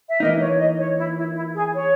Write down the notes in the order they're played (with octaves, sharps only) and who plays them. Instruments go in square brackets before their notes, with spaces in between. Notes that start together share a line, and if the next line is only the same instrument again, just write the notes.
[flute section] E5
[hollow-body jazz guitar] E3 A#3 D#4 [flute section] D#5
[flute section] C#5
D#5
C#5
E4
E4
E4
G#4
C#5